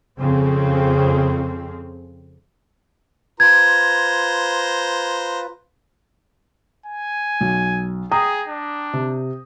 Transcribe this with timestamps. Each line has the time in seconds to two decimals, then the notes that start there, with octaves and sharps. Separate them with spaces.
0.19 F2 C#3 C4
3.40 F4 B4 C5 A#5 G#6
6.86 G#5
7.41 B1
8.11 G#4 G5 A#5 D#6
8.48 D4
8.93 C3